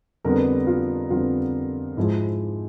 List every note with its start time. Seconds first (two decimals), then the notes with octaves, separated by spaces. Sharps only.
0.25 F2 D3 G3 B3 A#4
0.67 F4
1.10 F2 D3 G3 B3 F4
1.97 G#2 F3 G#3 E4